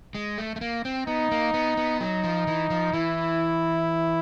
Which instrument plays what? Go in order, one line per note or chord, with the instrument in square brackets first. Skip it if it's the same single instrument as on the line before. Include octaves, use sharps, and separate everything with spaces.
[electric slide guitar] G#3
A3
A3
A#3
C4
[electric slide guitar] B3 [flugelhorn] D#4
[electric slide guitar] A#3
B3
B3
[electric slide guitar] F#3 [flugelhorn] D#4
[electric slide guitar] F3
E3
F3
[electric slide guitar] E3 [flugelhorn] E4